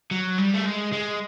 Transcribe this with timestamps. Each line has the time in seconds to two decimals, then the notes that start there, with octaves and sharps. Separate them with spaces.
0.11 F#3
0.38 G3
0.54 A3
0.66 G#3
0.93 G#3